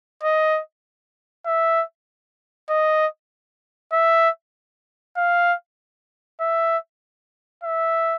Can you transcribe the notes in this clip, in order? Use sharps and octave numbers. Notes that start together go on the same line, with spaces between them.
D#5
E5
D#5
E5
F5
E5
E5